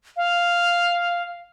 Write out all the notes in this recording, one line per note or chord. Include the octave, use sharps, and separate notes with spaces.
F5